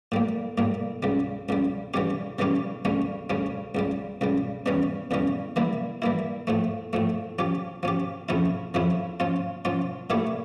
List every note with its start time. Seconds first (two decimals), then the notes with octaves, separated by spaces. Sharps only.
0.12 A2 G3 A#3
0.58 A2 G3 A#3
1.03 C#2 C#3 G3
1.49 C#2 C#3 G3
1.94 C#3 E3 G3 C#4 G4
2.39 C#3 E3 G3 C#4 G4
2.85 D2 C#3 G3 C#4
3.30 D2 C#3 G3 C#4
3.75 C#2 C#3 G3
4.21 C#2 C#3 G3
4.66 E2 C#3 E3 G3 C#4
5.11 E2 C#3 E3 G3 C#4
5.56 E3 G3 A#3 E4
6.02 E3 G3 A#3 E4
6.47 A2 F3 A3
6.93 A2 F3 A3
7.39 F3 C#4 G4
7.83 F3 C#4 G4
8.29 F2 C#3 F3 C#4 E4
8.74 F2 C#3 F3 C#4 E4
9.20 F3 C#4 F4
9.65 F3 C#4 F4
10.10 A#2 A3 E4 G4 C#5